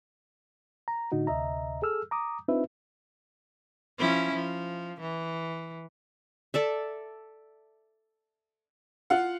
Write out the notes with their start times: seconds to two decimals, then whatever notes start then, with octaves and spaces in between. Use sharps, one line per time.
0.88 A#5
1.12 A2 D3 D#4 F#4
1.27 D2 C3 D#5 E5 A#5
1.82 G#4 A4 E6 F6
2.11 A#5 D6 D#6
2.48 C4 D4 D#4 F4 B4 E5
3.99 F3 C#4 E4
4.35 F3
5.01 E3
6.54 A4 D5 E5
9.10 F4 F5 F#5